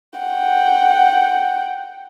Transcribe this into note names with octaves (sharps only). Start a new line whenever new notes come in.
F#5 G5